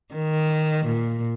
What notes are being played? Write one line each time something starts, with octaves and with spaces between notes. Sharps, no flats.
D#3
A#2